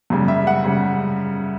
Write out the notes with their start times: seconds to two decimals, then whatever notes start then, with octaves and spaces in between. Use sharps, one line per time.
0.10 F#2 C#3 G3
0.28 E5
0.47 F#5
0.64 C#3 G3